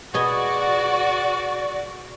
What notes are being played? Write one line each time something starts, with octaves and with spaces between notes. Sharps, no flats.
B2 F#4 G#4 D5 D#5 C#6